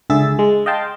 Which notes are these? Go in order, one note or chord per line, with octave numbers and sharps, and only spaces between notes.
C#2 D3 G#4 E5 E6 A6
G#3
D#5 F5 G5 A5 C6